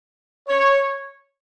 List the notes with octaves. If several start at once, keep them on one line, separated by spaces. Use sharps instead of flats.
C#5